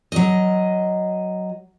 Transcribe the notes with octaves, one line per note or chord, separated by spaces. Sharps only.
F#3 D#5